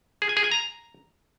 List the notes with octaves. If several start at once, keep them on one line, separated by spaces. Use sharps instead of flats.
G#4
G#5
G#4
G#5
A#5